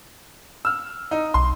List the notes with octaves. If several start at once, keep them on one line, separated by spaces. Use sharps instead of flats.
E6 F6
D#4
B1 C6